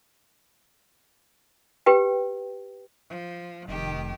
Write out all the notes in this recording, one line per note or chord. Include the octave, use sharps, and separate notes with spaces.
G4 B4 G5
F3
F1 D#3 G4